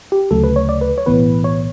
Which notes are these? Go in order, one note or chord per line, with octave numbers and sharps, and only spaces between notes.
G4
D2 C#3 F#3 A3 A4
B4
C#5
D5
B4
C#5
B1 A2 E3 B3 B4
C#5